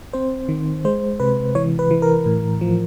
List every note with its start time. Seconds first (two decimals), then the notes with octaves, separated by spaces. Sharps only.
0.13 C4 C5
0.49 D#3
0.85 G#3 C5
1.20 C3 B4
1.55 E3 C#5
1.79 B4
1.91 E3
2.02 A#4
2.26 A2
2.61 F3